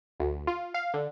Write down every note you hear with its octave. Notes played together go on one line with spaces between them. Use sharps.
D2
F4
F5
D3